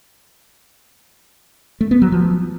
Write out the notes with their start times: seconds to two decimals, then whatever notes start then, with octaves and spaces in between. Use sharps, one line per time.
1.81 A3
1.91 B3
2.02 F#3
2.12 F3